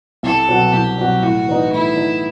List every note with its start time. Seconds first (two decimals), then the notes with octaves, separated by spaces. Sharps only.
0.23 C2 A4
0.48 B2 F#3 C4 F#4
0.72 C2 G4
0.98 B2 F#3 C4 F#4
1.22 A2 F#4
1.47 E3 B3 D#4
1.72 A2 E4
1.96 E3 B3 D#4